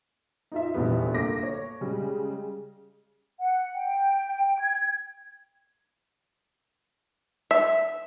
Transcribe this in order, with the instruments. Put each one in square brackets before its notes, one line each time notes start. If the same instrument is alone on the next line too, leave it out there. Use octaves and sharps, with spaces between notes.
[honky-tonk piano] D#4 F4 E5
F1 A#1 E2 G3 B3
D3 A3 A#3 D6 A#6
C#5
C#3 G3 G#3
[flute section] F#5
G5
G#6
[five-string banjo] E5